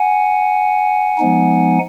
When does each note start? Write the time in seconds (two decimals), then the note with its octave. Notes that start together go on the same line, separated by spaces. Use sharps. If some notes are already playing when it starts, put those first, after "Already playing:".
Already playing: F#5 G#5
1.18 F3 G#3 B3 D#4